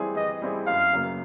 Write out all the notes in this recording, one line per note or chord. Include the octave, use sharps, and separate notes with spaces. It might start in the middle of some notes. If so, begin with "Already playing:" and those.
Already playing: E3 G3 C4 E4 G#4
E3 D#5
G3 C4 E4 G#4
F#2 F5
C#3 F#3 A#3